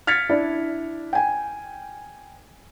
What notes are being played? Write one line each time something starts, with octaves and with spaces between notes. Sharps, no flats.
F6 G#6 A6 B6 C#7
D4 E4
G5 G#5